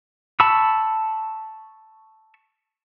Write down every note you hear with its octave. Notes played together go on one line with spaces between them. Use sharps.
A5 B5 C#6 E6